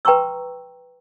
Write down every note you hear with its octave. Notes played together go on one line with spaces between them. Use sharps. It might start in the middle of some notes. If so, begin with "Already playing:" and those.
B4 G5 A#5 C6 C#6 E6